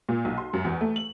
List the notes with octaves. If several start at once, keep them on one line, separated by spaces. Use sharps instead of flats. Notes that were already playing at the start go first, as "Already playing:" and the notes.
A#2
B1
C6
F#2
E2
A3
F#7